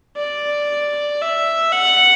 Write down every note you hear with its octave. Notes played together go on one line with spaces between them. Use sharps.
D5
E5
F#5